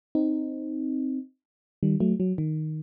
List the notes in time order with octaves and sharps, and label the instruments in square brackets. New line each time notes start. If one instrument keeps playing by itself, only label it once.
[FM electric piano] C4 D#4
D#3 G3
F#3 A3
F#3
D#3